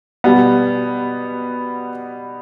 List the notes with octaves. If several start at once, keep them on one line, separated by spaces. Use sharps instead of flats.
B2 G3 B3